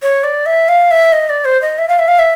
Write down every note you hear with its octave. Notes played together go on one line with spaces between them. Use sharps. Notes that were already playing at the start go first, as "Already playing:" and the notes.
C#5
D5
E5
F5
E5
D#5
D5
C5
D#5
E5
F5
E5
F5
E5